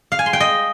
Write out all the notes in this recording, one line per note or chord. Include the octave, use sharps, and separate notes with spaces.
F5
G#5
C6
G5
D#5